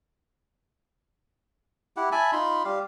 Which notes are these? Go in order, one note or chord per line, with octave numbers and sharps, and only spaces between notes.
E4 G4 F#5
E5 G#5 A5 B5
D#4 F4 B5 C6
G3 G4 F5